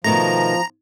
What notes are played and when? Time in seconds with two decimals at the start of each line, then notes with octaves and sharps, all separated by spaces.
0.04 B2 D#3 F3 A3 A#5